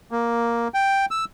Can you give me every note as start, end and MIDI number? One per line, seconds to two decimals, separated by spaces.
0.11 0.68 58
0.74 1.06 79
1.11 1.25 88